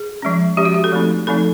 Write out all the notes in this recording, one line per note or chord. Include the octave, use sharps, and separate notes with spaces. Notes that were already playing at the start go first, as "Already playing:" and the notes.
Already playing: G#4
F3 G#3 C#4
F3 G#3 C#4 G4
F#4
G4
A4
F3 A3 C4 D#4
F3 A3 C4 D#4 A4